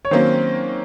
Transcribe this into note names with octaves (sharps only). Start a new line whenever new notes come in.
C#5
D#3 F#3 A#3 C4 C#4 C5